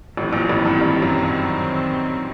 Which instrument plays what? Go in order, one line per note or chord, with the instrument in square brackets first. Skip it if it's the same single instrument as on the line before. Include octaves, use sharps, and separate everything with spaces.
[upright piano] A1 A2 [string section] D#3 F#3 C4
[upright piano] A#1 A#2
A1 A2
G2
G2
F#2
G2